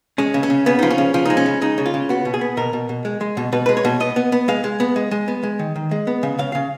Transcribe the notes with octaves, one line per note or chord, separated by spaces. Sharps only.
G#3 C#4
C#3
C#4
C#3
C#3 B3
F3 D#4
C#4
C#3
F3 C#4
G#3 D#4
C#4
C#3
G#3 D#4
C#3
F4
C#3
B3 F#4
B2
G#4
B3
B2 A#4
B2
B2
G#3
G#3
B2
B2 B4
G#3 B4
C#5
B2
B3 D#5
B3
B3
G#3 F5
G#3
B3
G#3
G#3
B3
G#3
D#3
D#3
G#3
B3
C#3
C#3 F5
C#3 F5